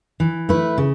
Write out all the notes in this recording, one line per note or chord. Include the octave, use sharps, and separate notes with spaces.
E3
A3 E4 B4
C#3